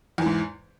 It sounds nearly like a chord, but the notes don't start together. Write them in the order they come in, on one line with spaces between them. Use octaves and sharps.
E2 E3 G#2